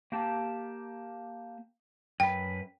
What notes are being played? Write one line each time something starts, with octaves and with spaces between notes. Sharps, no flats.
A#3 G4 A5
F#2 B4 G5